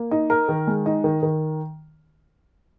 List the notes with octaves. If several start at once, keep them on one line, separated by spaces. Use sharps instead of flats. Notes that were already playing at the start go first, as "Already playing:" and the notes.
Already playing: A#3
D#4
A#4
D#3
G#3
D#4
D#3
D#3